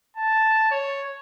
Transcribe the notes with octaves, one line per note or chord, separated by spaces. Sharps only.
A5
C#5